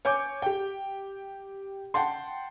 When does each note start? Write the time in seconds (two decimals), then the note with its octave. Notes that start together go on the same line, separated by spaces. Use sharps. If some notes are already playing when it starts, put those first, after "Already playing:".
0.05 C#5 G#5 D6 G6
0.42 G4 G5
1.94 F#5 G5 A5 C6